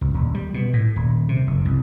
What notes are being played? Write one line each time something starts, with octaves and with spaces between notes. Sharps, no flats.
C#2
D#1
G3
B2
A2
D#1
C3
F#1
C2